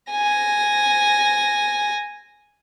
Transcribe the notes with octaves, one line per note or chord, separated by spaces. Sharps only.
G#5 A#6